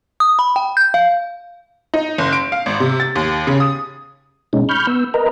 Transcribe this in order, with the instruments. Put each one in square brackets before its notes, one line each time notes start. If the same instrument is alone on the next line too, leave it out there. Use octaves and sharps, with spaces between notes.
[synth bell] D#6
B5
G5
G6
F5
[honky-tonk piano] D#4
F#1
D7
F5
G#1
C3
A6
D#2
C#3
D#6
[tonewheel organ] B2 G#3 C#4 D#4
B5 C#6 F6 G6
B3 E6
A#4 B4 D#5 A#5